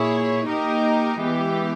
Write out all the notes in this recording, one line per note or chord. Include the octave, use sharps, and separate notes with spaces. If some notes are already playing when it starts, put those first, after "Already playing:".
Already playing: A#2 A#3 E4 G#4 C#5
A#3 D#4 G4 A#4 D#5
E3 G#3 B3 G4